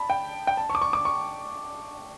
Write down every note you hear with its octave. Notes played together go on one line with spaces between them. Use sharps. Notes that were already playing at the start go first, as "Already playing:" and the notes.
Already playing: A5 B5
G5
G5
A5
C#6
D6
C#6
D6
C#6